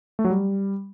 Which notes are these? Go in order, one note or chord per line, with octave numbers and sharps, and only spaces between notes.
A3
F#3
G3